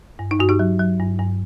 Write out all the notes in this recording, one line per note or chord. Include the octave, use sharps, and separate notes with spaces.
G2
D#4
G2 F#4
D#4 G4
F#3
F#3
G2
G2